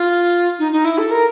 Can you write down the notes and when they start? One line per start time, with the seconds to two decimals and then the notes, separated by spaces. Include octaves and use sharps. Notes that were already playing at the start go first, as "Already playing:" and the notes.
Already playing: F4
0.58 D#4
0.71 D#4
0.84 E4
0.98 A4
1.10 A#4